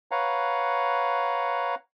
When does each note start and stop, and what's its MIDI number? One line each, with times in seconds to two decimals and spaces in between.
0.11 1.75 71
0.11 1.75 73
0.11 1.75 77
0.11 1.75 78
0.11 1.75 82